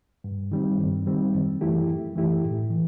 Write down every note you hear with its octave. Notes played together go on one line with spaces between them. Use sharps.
G2
D#3 G3 C4
G2
D#3 G3 C4
F#2
E3 A3 E4 G4
F#2
E3 A3 E4 G4
A2
E3